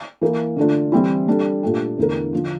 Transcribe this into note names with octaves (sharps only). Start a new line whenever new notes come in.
E3 A#3 E4 A#4
D3 A3 D4 F4
E3 G3 C4 E4
G3 D4 A4
A#2 A3 D4 G4
E2 D3 A3 E4 A#4
D3 F3